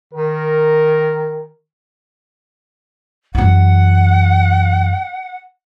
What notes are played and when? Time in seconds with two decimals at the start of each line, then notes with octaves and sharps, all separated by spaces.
0.13 D#3 A#4
3.35 F#2 E3 F#5